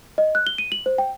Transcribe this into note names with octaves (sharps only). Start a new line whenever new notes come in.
D#5
F#6
G7
D#7
F#7
C5
G5